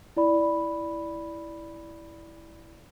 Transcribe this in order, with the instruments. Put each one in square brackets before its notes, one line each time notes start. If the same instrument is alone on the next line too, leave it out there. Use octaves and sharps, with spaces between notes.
[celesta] E4 D5 B5